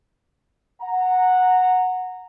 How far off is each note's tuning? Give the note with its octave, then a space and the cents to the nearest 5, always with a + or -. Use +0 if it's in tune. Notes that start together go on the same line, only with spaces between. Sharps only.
F#5 -10 A#5 -15